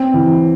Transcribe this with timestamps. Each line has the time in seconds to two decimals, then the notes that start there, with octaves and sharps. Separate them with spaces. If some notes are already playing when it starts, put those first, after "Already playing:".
Already playing: C4
0.14 E3